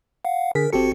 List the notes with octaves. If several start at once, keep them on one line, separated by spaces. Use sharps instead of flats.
F5 F#5
D3 G#4 A#4 B6
G#1 C4 F#4 G4 A4 C#7